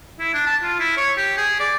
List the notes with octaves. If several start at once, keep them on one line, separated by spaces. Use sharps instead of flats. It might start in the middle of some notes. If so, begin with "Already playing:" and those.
E4
D4
A5
F4
E4
C#5
G4
G#4
D5